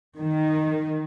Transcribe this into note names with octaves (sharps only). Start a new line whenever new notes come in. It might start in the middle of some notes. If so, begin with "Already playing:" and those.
D#3